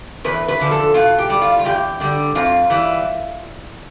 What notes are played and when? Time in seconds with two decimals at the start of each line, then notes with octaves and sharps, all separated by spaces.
0.24 E2 B4
0.48 B4
0.60 D3 F3
0.71 A4
0.94 B2 F4
1.18 G4
1.29 G3
1.42 F4
1.59 F4
1.65 E2 G4
2.00 D3 G3
2.35 F2 F4
2.70 E3 G3